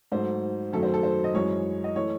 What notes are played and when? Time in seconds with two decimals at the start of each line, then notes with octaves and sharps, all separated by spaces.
0.12 G#2 F#3 A3 C5
0.73 F#2 D#3 F#3 A3 A4
0.83 C5
0.94 A4
1.03 C5
1.24 D#5
1.34 F#2 E3 G#3 C#5
1.84 D#5
1.96 E3 A3 C#5